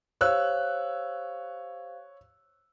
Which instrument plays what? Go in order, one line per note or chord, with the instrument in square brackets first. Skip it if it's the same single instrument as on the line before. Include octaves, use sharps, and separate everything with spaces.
[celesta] G4 C5 F5 [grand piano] C#5 E6 F#6